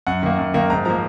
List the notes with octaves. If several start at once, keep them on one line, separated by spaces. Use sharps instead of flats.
F#2 F#5
D#3 A#3
F#2
D#3 A#3
G#2 A#5
F3 A#3 A#5